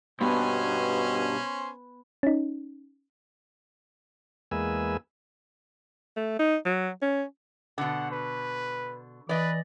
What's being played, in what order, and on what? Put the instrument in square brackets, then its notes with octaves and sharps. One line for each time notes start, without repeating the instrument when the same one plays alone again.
[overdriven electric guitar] G2 [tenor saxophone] B2 [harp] B3 [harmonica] C#4 C5 G#5
[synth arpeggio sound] C#4 D#4
[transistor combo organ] E2 G#3 A#3 B4 G#5 E6
[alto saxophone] A3
D#4
F#3
C#4
[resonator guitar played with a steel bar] B2 D3 [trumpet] F#5
[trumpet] B4
[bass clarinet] E3 [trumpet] B4 [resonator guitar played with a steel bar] D5 D#5